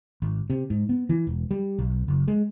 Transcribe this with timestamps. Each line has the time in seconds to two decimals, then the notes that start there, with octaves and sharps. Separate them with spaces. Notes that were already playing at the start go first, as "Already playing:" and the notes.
0.22 G#1
0.50 C3
0.70 G#2
0.89 B3
1.09 E3
1.27 E1
1.51 G3
1.78 B1
2.08 F#1
2.28 G#3